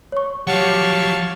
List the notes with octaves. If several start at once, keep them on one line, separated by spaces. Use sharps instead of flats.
C#5 C#6
F3 F#3 G4 C#5 F5 F#5 A5 C#6